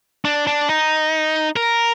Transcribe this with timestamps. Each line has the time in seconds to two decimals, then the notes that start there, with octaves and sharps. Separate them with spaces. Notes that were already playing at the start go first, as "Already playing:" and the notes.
0.25 D4
0.47 D4
0.69 D#4
1.56 A#4